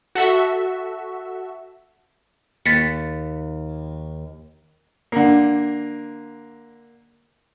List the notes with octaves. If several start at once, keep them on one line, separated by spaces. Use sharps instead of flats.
F#4 A4 E5
D#2 A6 B6 C#7
D3 A#3